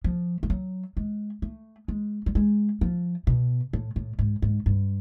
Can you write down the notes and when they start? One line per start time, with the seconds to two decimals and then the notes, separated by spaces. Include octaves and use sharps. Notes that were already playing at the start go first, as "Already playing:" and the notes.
0.04 F3
0.43 G3
0.50 F#3
0.97 G#3
1.42 A3
1.88 G#3
2.26 G3
2.35 G#3
2.81 F3
3.27 B2
3.73 A2
3.96 A2
4.19 G#2
4.42 G#2
4.66 G2